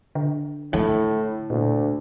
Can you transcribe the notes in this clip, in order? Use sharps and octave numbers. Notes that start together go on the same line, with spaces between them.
D3
A2 E4
D2 A#2